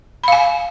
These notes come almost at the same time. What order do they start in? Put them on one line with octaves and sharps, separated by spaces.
B5 F5 G#5